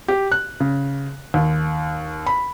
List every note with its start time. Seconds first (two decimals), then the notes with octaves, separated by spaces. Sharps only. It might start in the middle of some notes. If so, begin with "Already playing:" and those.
0.08 G4
0.32 F#6
0.60 C#3
1.34 D#2
2.26 B5